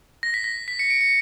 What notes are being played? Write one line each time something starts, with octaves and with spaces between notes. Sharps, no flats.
A#6
B6
A#6
B6
C#7
D7
C#7